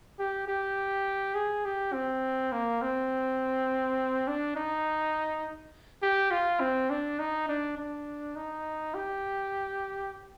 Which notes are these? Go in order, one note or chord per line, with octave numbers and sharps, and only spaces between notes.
G4
G4
G#4
G4
C4
A#3
C4
D4
D#4
G4
F4
C4
D4
D#4
D4
D4
D#4
G4